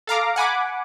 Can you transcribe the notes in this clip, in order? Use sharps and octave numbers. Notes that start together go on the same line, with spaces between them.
A4 F5 A#5 D6
F#5 G#5 B5 D6